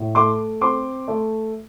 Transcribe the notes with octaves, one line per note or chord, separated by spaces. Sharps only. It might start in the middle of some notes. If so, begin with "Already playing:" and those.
Already playing: A2
A3 C6 D6
C4 C6 D6
A3